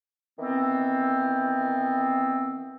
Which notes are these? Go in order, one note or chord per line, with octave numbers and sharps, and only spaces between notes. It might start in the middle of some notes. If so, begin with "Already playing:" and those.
D#3 E3 B3 C4